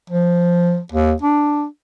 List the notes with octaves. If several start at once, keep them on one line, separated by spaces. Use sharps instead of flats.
F3
D#2
D4